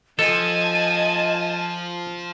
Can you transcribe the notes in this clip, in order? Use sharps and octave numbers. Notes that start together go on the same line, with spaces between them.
F3 A4 D#5 G#5 A5